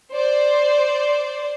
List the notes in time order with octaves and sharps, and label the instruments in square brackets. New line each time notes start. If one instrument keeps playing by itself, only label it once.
[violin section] C5 D5